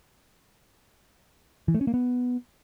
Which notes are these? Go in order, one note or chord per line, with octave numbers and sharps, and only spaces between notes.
E3
A3
C#4
A#3
B3